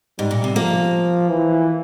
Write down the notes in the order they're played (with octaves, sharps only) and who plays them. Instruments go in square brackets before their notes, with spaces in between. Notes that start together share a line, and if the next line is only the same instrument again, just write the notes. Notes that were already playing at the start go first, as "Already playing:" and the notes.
[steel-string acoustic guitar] G#2 [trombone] G3
[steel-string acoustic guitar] A#2
C3
[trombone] F3 [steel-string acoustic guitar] A#3
[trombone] E3